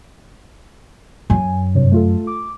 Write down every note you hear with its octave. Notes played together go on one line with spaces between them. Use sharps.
F#2 G#5
G2 C3 C#5
A3 F4 A4
D6